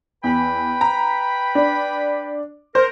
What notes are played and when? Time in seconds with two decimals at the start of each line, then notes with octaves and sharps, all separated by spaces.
0.24 E2 B4 G5 B5
0.81 A#5
1.55 D4
2.75 A#4 C5